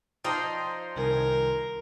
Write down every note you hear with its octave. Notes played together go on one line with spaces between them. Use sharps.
F3 D#4 D5 D#5 G5 A#5 C6
C2 D#3 A#4 G#5